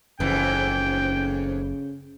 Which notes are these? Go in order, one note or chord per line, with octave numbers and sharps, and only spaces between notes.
F#1 F2 G#2 C#3 E3 G5